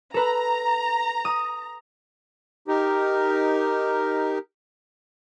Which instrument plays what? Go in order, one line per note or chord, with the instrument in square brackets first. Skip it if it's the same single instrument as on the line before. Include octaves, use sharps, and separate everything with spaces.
[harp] A4 B4 [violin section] A#5
[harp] D#6
[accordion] D#4 G4 A#4